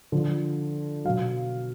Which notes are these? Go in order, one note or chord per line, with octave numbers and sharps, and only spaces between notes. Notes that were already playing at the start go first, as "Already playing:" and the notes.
D3 F3
B2 F#3 F5